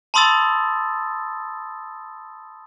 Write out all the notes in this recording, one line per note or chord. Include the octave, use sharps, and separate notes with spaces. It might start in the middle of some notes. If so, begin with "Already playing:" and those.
A5 B5 C6 D#6 E6 A6